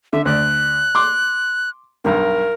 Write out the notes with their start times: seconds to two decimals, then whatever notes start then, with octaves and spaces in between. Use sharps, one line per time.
0.13 D3 E5
0.25 D2 D5 F#6
0.95 C6 D6
2.04 B1 G2 A#4